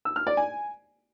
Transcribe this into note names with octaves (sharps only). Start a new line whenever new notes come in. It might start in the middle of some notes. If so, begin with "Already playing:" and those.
E6
F6
D5
G#5